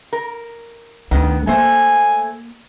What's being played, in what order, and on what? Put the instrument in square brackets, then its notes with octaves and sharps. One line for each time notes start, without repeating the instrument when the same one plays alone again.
[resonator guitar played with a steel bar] A#4
[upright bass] D2 D4 [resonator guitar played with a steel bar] D#3 B3
[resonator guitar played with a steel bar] A3 C5 [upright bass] A#3 [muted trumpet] G#5